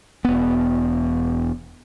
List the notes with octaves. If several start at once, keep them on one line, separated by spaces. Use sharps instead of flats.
E1 B3